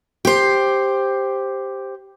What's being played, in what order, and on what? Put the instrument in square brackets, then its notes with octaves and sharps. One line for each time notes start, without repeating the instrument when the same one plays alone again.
[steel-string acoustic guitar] G4 C5